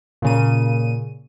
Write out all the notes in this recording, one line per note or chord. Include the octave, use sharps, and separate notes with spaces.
A#2 C#3 D#7